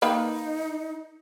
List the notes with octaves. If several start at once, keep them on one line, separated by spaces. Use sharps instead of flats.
D#3 A#3 D#4 B4